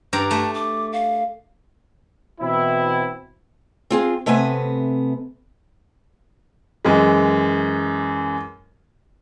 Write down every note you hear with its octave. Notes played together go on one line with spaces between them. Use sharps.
G2 D5 A#5
A3 A5
D6
F5
B2 E3 B3 C4 E4
C4 F4 G#4
C3 A3 B3 C4 G#5
F#2 E3 G#3